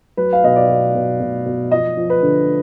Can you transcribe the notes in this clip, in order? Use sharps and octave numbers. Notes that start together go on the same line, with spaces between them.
F#3 B4
F5
B2 D#5
D5
B2
B2
B2
B2
F3 D#5
F3
B4
D3